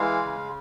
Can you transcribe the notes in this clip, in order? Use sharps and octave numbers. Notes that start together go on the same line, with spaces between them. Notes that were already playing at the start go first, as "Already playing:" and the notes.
Already playing: E3 G#3 F5
C#3